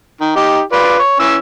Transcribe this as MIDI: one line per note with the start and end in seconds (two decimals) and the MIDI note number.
0.21 0.34 51
0.36 0.61 63
0.36 0.61 67
0.72 0.98 65
0.72 0.98 71
0.72 0.98 74
0.99 1.18 73
1.20 1.36 52
1.20 1.36 61
1.20 1.36 88